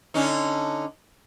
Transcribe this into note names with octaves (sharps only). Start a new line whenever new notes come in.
D3 C#4 D#4